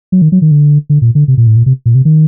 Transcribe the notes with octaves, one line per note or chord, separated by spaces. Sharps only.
F#3
D#3
F#3
D#3
D3
D3
A#2
D3
C3
A#2
A2
A#2
C3
A#2
C3
D#3